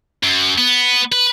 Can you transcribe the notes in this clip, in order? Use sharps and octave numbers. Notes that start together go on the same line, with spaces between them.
F#2
B3
B4